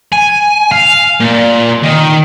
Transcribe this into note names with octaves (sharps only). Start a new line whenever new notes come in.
G#5
F5
A#2
D#3